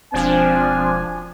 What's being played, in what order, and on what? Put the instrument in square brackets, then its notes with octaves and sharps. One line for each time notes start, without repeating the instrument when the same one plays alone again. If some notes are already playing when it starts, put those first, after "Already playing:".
[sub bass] E1 [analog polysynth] F3 D4 [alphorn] C4 [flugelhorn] G#5